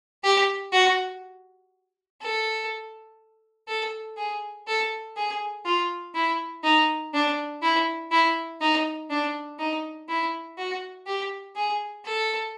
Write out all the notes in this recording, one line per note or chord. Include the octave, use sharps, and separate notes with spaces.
G4
F#4
A4
A4
G#4
A4
G#4
F4
E4
D#4
D4
E4
E4
D#4
D4
D#4
E4
F#4
G4
G#4
A4